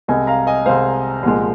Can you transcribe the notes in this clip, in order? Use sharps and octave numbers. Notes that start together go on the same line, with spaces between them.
C2 C3 G#3 D#5 G#5
F5 A#5
D#5 G#5
C2 C3 G#3 C5 F5
C2 A#2 F3 G#3